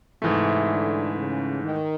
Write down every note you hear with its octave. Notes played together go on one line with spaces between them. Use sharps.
G#2 C3 E3 A3
D3
C#3
D#3